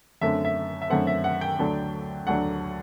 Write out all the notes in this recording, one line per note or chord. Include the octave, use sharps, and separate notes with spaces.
F#2 D3 A3 C4 E5
E5
E5
F#2 D3 A3 C4 F#5
E5
F#5
G5
D2 D3 F#3 A3 D4
D2 D3 F#3 A3 D4 F#5